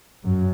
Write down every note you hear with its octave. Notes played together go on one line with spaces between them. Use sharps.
F#2